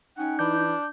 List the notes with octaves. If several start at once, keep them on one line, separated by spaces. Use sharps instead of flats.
C#4 D#4 F#5 G5
E3 D4 E4 G6